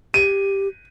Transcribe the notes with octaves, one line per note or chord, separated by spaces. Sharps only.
G4 D#7